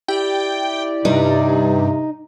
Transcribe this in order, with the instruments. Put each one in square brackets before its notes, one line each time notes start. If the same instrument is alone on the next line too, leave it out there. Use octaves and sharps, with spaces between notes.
[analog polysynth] E4 G4 D5 [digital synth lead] G5
[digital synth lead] G2 [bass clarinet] C3 [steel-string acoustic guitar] D#4